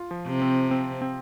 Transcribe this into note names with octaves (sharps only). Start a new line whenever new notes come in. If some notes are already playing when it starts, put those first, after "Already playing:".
Already playing: F4
F3
C3
C4
C4
C4